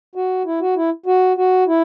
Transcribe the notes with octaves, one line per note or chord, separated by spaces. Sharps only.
F#4
E4
F#4
E4
F#4
F#4
E4